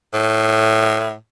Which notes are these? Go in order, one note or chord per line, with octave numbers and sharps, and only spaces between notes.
A2